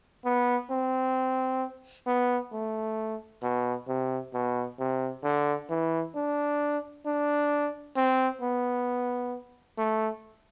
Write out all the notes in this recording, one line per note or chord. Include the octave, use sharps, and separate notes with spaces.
B3
C4
B3
A3
B2
C3
B2
C3
D3
E3
D4
D4
C4
B3
A3